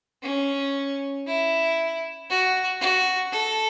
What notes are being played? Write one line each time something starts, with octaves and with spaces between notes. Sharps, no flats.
C#4
E4
F#4
F#4
A4